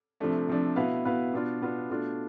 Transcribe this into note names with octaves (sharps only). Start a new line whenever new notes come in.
C3 F3 A3 D4
C3 F3 A3 D4
B2 B3 E4 B4 F5
B2 B3 E4 B4 F5
B2 B3 D4 F4
B2 B3 D4 F4
B2 A3 D4 F4